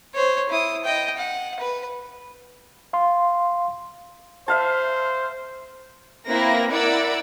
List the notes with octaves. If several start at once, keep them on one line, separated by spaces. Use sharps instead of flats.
C5 C#5
E4 D#6
D#5 G5
F#5
B4
F5 C6
C5 E5 F5 A5
A#3 C4 E4 B4 A#6
E4 A#4 D5 F#5 D6 E6